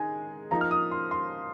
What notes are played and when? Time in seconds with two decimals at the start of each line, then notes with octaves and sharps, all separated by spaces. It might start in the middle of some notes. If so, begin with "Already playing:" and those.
Already playing: D#3 G#3 D#4 G#4 G#5
0.51 F3 A#3 D#4 A#5
0.61 F6
0.71 D#6
0.91 C6
1.11 C6